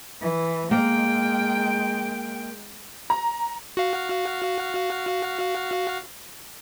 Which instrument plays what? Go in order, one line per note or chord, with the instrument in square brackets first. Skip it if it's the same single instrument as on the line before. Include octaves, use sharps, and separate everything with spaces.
[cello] E3
[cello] G#3 G5 [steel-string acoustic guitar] A#3
[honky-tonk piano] A#5
[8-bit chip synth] F#4 F5